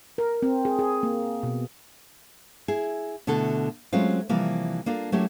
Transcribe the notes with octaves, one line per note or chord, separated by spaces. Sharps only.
A#4
C4
G#4
G#4
A#3
B2
E4 G#4
B2 D3 A3 E4 A4
F#3 G#3 A3 C4 C#4 F4
C3 E3 F3 G3 A#3
A#3 D4 F4 A4
F#3 A3 A#3 C#4 E4 G4